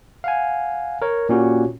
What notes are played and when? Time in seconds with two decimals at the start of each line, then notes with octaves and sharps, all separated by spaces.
0.24 F5 F#5 G#5
1.02 A#4 C#5
1.29 A#2 C#4 F#4 G4